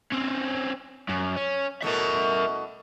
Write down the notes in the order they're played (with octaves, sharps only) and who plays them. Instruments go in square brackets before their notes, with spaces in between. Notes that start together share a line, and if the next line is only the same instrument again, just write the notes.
[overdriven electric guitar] C4 C#4
F#2
C#4
[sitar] B2 A3 E4 [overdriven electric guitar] A#4 E5